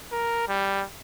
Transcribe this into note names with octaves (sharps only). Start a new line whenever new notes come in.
A#4
G3